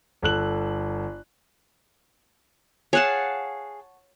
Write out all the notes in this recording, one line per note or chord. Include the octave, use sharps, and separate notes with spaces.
G1 A4 F#6 F#7
G#4 C#5 F5 F#5 A5